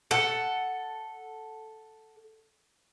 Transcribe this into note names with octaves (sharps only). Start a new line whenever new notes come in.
A4 F#5